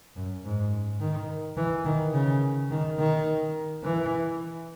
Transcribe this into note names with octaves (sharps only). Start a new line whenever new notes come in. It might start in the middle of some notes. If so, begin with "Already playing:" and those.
F#2
G#2
D#3
E3
D#3
C#3
D#3
D#3
E3